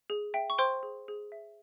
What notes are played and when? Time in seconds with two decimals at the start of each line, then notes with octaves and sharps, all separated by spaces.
0.10 G#4
0.34 E5 G5
0.50 C#6
0.58 C5 G5 C6
0.83 G#4
1.08 G#4
1.32 E5